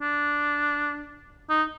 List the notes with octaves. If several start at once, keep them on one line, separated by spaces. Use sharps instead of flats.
D4
D#4